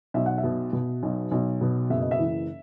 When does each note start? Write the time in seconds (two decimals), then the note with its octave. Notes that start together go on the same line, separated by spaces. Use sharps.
0.14 B1 E5
0.26 F#5
0.38 E5
0.44 B2
0.73 B2
1.03 B1
1.32 B1
1.61 B2
1.90 F#1 E5
2.01 D#5
2.11 E5
2.19 E3